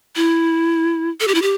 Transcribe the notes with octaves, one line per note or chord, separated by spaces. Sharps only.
E4
A4
G4
E4
G4